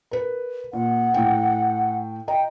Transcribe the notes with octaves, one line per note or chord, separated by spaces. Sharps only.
A#4 B4
A#2 F#5
A2 G5
D#5 G5 A#5